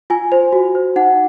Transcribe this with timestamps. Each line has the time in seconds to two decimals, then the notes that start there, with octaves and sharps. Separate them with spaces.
0.10 F4 G#5
0.32 C5
0.52 F#4
0.75 C5
0.96 D#4 F#5